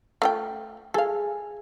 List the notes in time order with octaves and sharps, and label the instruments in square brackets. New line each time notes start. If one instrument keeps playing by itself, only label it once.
[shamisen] A3 F4 G5
[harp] G#4 [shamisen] A4 F5